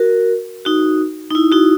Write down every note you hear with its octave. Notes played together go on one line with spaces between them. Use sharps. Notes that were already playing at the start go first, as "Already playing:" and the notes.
Already playing: F#4 A#4
D#4 F#4
D#4
E4
D#4 F#4